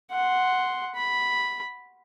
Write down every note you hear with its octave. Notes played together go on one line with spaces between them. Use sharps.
F#5 C6
B5